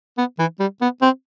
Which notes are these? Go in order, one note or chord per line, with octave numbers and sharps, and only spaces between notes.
B3
E3
G3
B3
C4